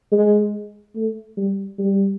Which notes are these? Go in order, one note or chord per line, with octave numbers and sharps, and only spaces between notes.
G#3
A3
G3
G3